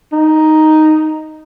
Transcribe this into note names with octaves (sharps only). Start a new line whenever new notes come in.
D#4